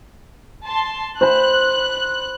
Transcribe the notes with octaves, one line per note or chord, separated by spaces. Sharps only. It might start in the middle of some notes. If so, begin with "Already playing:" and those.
A5 C6
C5 B5 F#6